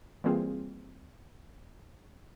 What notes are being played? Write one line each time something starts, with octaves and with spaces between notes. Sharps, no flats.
E3 G3 A#3 C4 F4 G#4